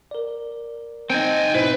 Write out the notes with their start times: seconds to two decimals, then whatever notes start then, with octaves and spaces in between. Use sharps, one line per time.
0.11 A#4 D5
1.10 C4 D#4 G5 G#5
1.54 G#2 B2 E4 B4 C5